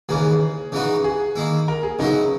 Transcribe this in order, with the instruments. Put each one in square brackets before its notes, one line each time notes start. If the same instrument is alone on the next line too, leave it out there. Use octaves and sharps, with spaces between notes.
[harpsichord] D#2 C#3 E3 A#3 [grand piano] G#4
[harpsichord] C#3 E3 B3 D#4 F#4
[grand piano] G#4
[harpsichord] D#3 A#3 E4
[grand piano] A#4
G#4
[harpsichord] C#3 F#3 B3 E4 [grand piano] D#4